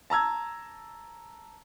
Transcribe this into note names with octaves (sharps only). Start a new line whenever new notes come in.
A5 A#5 E6 G#6